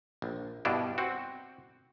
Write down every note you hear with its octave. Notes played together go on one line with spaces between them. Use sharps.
A#1
G2 B2 D4 E4
C4 F#4